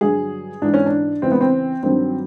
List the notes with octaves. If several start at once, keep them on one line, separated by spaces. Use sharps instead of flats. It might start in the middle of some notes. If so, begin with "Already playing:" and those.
G2 D3 F#3 G#4
G#2 E3 D4
C#4
D4
E2 C#3 E3 C4
B3
C4
G2 D#3 F#3 C4